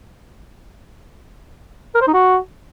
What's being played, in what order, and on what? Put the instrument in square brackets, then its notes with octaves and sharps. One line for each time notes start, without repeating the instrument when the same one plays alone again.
[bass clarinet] A#4
C5
D#4
F#4